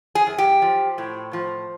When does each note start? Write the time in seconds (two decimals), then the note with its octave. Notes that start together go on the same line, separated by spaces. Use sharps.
0.15 G#4
0.27 F#2
0.38 G4
0.62 F3
0.98 A2
1.33 F3